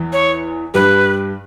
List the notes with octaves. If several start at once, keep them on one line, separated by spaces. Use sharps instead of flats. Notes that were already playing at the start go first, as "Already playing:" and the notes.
Already playing: E2 E3
C#5
G2 G3 B4